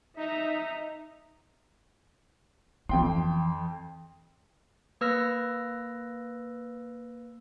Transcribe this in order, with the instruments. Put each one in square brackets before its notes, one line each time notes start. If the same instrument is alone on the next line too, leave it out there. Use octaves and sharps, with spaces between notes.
[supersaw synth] D#4 [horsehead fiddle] E5 A#5
[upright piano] F2 G5 C6 [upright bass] E3
[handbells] A#3 B4 E6 F6 A#6